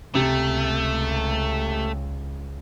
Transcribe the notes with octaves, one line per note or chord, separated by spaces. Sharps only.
C#2 C3 A3